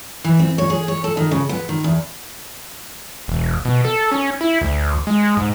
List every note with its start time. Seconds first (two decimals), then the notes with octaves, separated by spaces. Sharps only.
0.24 E3
0.39 C4
0.58 C#5
0.70 G#4
0.88 C#5
1.04 A4
1.17 D#3
1.31 C#3
1.49 B3
1.69 D#3
1.84 E2
3.28 E1
3.65 B2
3.84 A4
4.12 C#4
4.41 E4
4.61 D2
5.07 G#3
5.37 G#2